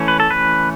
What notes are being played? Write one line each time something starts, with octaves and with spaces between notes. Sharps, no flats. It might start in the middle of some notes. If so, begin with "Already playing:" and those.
Already playing: E3 A3 C#4
B4
A4
B4